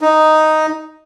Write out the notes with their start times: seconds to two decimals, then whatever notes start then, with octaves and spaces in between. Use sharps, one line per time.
0.01 D#4